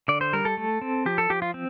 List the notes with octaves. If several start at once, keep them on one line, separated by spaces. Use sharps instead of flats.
D3 D5
C5
G3 A#4
A4
A3
C4
F3 G4
A4
F3 G4
F4
C4